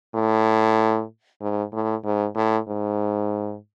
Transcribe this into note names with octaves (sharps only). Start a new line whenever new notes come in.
A2
G#2
A2
G#2
A2
G#2